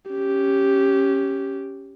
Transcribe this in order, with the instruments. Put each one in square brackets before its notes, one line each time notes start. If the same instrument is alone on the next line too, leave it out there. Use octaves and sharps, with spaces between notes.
[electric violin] C#4 G4